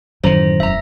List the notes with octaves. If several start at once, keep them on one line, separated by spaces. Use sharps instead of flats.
F#2 A2 D#3 E3 C5 A#5
E1 E5 A#5